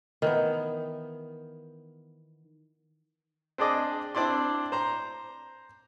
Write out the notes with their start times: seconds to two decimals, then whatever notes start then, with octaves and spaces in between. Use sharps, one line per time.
0.22 D#3 E3 B3
3.58 C4 D4 G#4 D5 D#5
4.15 C4 D4 E4 D5 C6
4.72 C5 A#5